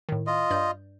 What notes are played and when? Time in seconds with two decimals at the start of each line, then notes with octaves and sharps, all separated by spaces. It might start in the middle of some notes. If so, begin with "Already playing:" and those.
0.09 A2 D#3
0.27 F4 D#5
0.50 G2 D5 G6